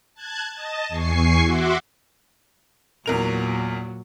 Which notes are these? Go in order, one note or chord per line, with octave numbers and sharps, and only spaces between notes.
A5 F#6 G#6
D#5 A5
E2 G#5 C#6 C7
F#4 E5 F#5 C6 D6
E2 A#2 F#3 A#4 F7